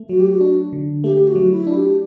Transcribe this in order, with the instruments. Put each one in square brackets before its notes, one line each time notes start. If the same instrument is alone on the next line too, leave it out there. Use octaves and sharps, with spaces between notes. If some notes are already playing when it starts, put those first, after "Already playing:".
Already playing: [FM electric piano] A3
[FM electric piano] F#3 [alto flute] F#4
[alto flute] G4
F#4
[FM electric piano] D4
D3
[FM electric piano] A3 [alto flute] G4
[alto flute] G4
F#4
[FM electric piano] F#3
[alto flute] E4
[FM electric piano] D4
[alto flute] G4